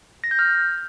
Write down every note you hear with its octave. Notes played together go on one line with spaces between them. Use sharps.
A#6
G6
F6